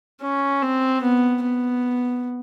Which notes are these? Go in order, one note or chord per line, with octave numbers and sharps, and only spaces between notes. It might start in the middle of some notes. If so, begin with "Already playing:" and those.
C#4
C4
B3
B3